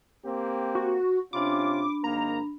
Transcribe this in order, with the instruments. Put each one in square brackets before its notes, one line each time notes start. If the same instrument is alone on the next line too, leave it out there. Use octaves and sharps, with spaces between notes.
[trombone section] A#3 C4 G4
[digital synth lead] F#4
[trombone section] C3 C#4 F4 [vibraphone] D4 B5 [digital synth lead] D6
[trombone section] G#1 D#3 A#3 [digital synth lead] A#5